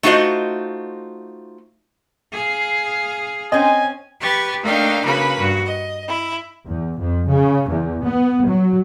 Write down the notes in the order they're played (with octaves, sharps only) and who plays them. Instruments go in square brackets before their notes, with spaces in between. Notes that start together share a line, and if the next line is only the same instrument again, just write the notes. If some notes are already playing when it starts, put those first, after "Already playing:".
[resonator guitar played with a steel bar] A3 D#4 F4 F#4 C5 D#5
[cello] G#4 F5
[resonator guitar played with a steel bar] C4 C#4 [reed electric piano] D#5 [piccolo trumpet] G#5
[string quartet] G4 B4 C#6 A6
A3 A#3 D4 D#4 F5 G5
C#3 A#3 F#4 B4 B5
G2 F#4
D#5
E4
[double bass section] E2
F2
C#3
E2
B3
F#3